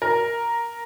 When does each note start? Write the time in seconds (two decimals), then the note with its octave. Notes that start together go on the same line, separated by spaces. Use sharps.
0.02 A#4